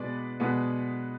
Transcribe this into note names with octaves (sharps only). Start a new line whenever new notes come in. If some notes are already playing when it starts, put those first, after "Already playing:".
Already playing: B2 G#3 B3 B4 D5
B2 G#3 B3